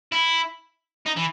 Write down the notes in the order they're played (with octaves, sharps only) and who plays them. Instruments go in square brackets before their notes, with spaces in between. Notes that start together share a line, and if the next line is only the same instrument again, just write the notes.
[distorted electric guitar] E4
D#4
E3